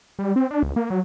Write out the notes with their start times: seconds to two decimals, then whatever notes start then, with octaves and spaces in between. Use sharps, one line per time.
0.19 G3
0.36 C4
0.51 D4
0.63 C#2
0.76 A#3
0.90 F#3